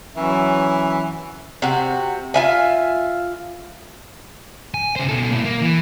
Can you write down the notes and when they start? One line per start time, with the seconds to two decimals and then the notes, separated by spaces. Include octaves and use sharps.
0.16 E3 F#3 C#4 E5
1.62 C3 F#4
2.34 F4 E5 G#5
4.74 G#5
4.96 C#3 C5
5.09 B2 A4
5.31 A#2 E4
5.45 A#3
5.62 E3